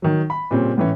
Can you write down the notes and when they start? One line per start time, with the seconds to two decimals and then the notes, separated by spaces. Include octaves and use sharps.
0.02 D#3 F#3
0.30 B5
0.51 A#2 C#3 G3 C4 C#4
0.78 A2 E3 C#4